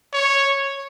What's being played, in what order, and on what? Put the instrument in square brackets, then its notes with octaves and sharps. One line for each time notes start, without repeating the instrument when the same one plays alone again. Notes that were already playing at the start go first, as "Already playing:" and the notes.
[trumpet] C#5